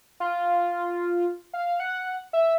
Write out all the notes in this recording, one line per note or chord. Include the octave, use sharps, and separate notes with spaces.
F4
F5
F#5
E5